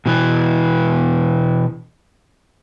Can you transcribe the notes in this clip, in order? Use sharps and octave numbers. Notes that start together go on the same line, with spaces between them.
B2 E3 B3